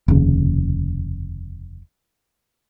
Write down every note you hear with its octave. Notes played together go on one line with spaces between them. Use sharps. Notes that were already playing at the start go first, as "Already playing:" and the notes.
F1 D#2 C#3